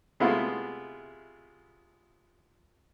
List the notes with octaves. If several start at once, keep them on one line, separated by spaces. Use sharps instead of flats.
C3 G#3 A3 B3 E4 F4